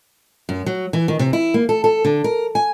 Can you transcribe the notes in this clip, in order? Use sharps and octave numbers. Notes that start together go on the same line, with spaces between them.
F#2
F#3
E3
D#3
C3
E4
A#3
A4
A4
D3
A#4
G#5